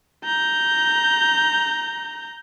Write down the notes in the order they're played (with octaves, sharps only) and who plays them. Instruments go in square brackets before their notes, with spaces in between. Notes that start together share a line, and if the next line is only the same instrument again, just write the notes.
[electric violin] A#5 G6